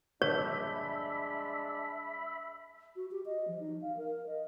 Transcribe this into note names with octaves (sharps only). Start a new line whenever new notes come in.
A#1 G2 D3 G#3 D4 C#5 E5 B5
F#4
G4
D#5
F3
D#4
F5
A#4
D#5